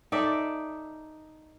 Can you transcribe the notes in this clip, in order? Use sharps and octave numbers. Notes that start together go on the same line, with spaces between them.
D#4 A4 D5 E5